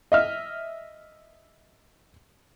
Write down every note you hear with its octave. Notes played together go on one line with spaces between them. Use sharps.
D#5 E5 F6